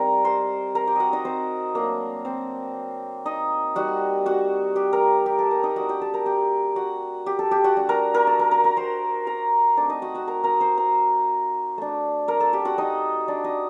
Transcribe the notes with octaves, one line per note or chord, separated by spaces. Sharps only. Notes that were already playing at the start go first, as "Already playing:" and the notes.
Already playing: G3 C4 D#4 A#4 A#5
C5 C6
A#4 A#5
G4 G5
F#4 D#5 F#5
D#4 D#5
C4 C5
F#3 A3 A#3 D4 A#4
C4 C5
D#4 D#5
G3 C4 D#4 F#4 F#5
F#4 F#5
G4 G5
A#4 A#5
G4 G5
A4 A5
A#4 A#5
D#4 D#5
A3 D4 F#4 F#5
G4 G5
A4 A5
A#4 A#5
G4 G5
F#4 F#5
G4 G5
A4 A5
G4 G5
F#4 F#5
A3 D4
A#4 A#5
A#4 A#5
A4 A5
A#4 A#5
A#4 A#5
A#4 A#5
C5 C6
A#4 A#5
A3 C4 D4 D#4 D5
D#4 D#5
F#4 F#5
F#4 F#5
A#4 A#5
A#4 A#5
C5 C6
A#4 A#5
A3 D4
A#4 A#5
A4 A5
G4 G5
F#4 F#5
D#4 D#5
D4 D5
D#4 D#5